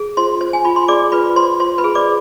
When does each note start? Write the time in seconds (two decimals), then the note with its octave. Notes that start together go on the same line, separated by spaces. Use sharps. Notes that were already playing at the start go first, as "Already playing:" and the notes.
Already playing: G#4
0.17 F4 C5 C6
0.41 C5
0.53 G#5
0.65 F4 B5
0.76 C6
0.88 G#4 D5 D6
1.12 F4 B4 B5
1.36 C5 C6
1.60 F4 C5 C6
1.78 B4 B5
1.84 G#4
1.95 D5 D6